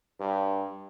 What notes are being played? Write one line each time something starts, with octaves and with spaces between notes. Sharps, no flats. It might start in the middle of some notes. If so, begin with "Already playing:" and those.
G2